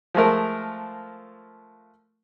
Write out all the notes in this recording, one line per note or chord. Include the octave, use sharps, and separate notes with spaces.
F3 G#3 A3 A#4